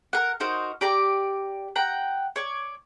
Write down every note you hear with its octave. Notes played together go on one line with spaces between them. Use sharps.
A#4 F#5
D#4 F#4 A#4 C5
G4 D5 A#5
F#5 G5 A#5
C#5 D5